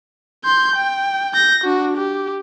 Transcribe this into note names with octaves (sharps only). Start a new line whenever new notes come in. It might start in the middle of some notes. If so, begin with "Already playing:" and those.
C6 G6
G5
G6 A#6
D4 F#4
G4